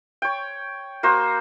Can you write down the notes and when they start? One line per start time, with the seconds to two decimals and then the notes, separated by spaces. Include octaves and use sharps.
0.22 C#5 G5
1.03 A#3 F#4 C5